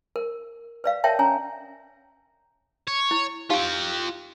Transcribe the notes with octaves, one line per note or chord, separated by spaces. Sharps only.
A#4
B4 D5 F5
A#4 C#5 E5 G5 A5
C#4 C#5 G#5 A#5
C#5
E4
D#4 F4 G4 F5 G5